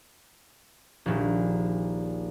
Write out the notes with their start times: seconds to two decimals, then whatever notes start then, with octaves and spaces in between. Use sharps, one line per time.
1.06 D#1 A#1